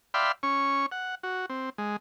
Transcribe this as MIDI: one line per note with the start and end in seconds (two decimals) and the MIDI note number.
0.14 0.32 74
0.14 0.32 76
0.14 0.32 77
0.14 0.32 79
0.14 0.32 83
0.14 0.32 84
0.43 0.86 61
0.43 0.86 85
0.92 1.15 78
1.23 1.46 66
1.50 1.70 60
1.78 1.96 56